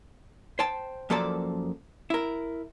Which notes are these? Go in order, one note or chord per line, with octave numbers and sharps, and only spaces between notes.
C5 G5 A5
F#2 F3 A#3 A4 C5 D5
E4 A#4